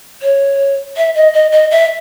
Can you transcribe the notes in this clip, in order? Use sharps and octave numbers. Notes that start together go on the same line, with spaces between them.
C#5
E5
D#5
D#5
D#5
E5